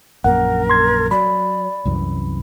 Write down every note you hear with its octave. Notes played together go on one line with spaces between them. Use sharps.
A#1 F#2 A#3 A#4 F#5
C6 G#6
F#3 D5 B5
C2 F#2 E3